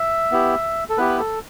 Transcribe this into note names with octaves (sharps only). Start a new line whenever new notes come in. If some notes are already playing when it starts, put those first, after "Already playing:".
Already playing: E5
B3 E4 G4
A4
B3 E4 G4 B4
A4